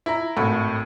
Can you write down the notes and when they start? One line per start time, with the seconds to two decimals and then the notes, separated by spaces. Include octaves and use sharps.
0.06 E4 A#5
0.37 G#1 A2 F#4 B5 C#6